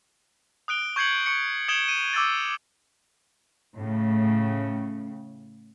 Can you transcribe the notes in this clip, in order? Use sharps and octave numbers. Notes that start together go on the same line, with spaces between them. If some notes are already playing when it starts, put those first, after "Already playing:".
D#6 F#6 D7 G7
C#6 G6 G#6 C7 C#7 F#7
C#6 C#7
D#6 G#6 D7 E7 F#7 G7
D#7
D6 E6 G#6 A6
A2 C#3